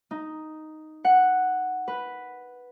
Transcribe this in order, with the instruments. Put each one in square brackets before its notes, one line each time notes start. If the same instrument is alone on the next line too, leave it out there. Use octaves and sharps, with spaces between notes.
[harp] D#4
F#5
B4